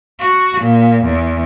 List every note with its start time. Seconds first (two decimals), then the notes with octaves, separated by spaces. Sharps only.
0.20 F#4
0.62 A#2
1.05 E2